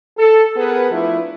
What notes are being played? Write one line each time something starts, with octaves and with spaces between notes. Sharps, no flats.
A4
B3 G#4 A#4 B4
F3 A3 D4 E4 F4